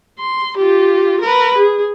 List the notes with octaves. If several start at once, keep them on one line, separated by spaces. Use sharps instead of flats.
C6
F4 G4
A#4 B4
G#4